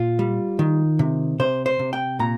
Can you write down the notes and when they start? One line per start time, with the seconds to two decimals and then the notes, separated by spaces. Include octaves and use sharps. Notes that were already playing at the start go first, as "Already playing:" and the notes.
Already playing: A#2 F4
0.19 G3
0.59 D#3
0.99 C3
1.40 C3 C5
1.66 C5
1.79 C3
1.93 G5
2.19 A#2 A#5